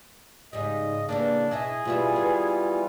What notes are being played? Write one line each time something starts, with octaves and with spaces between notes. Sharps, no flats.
G#2 C#3 G3 D#5
E3 G3 A#3 D4
B2 E4 G#4 D#5 E5
B2 E3 G3 B3 F4 E5
B3